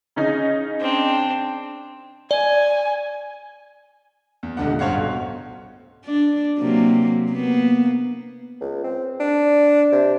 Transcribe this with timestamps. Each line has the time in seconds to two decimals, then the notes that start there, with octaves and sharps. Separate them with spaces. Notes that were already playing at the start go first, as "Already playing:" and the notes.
0.16 C#3 C#4 D#4
0.80 C4 D4
2.31 D5 G#5
4.43 E2
4.57 D#1 C#2 D3 D4 F#5
4.79 F1 G2 C5 C#5 F5 F#5
4.95 B1
6.05 D4
6.59 C3 F#3 A#3
7.31 A#3 B3
8.61 C#2
8.84 C4
9.20 D4
9.92 C3